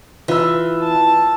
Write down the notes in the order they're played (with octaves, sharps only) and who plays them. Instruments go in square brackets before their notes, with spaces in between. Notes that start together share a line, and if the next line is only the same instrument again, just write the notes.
[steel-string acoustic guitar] E3 [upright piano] F4 E6
[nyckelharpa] A5